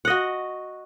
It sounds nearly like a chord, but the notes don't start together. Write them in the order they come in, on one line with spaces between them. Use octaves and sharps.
F#5 D#5 F#4